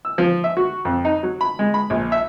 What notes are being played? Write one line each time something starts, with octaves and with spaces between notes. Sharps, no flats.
E6
F3
E5
F#4
F2
D#4
F#3
B5
G#3
B5
A#1
E5